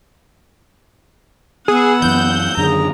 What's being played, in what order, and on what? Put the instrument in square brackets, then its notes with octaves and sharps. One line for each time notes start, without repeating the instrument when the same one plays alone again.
[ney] B3 [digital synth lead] G#4 [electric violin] F#5 E6
[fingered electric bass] F#2 E3 [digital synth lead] G6
[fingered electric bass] F#2 D3 D#3 [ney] G#4 [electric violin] A#5